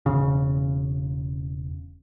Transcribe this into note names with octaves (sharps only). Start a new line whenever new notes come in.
E1 C#3